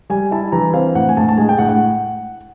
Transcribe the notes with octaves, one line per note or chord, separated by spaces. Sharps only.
G3 G#5
E4 A5
E3 A#5
C4 F5
A2 F#5
G#5
A2 A5
A5
G#3 G#5
G5
A2 F#5
F#5